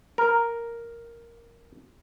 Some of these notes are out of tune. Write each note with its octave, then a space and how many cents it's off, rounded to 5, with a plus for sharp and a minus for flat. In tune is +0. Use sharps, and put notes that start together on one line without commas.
A#4 +0